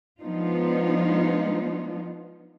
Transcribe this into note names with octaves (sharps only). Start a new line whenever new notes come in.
F3 G#3 B3 D4 D#4 F4